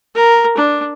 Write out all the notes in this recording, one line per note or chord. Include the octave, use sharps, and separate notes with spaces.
A#4
D4